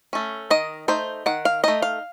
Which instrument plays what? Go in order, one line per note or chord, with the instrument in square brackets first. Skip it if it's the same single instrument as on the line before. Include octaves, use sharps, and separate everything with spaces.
[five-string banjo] A3 C#4
D#3 D#5
A3 D#4 C5
D#3 F#5
F5
A3 D#4 D#5
F5